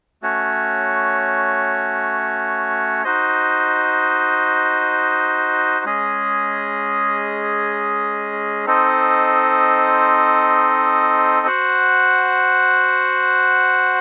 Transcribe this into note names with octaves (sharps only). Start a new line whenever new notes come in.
A3 C#4 F#4 C#5
D#4 F#4 C5 D#5
G#3 C#4 G#4 D#5
C4 D#4 A4 C5 D#5
F#4 C5 F#5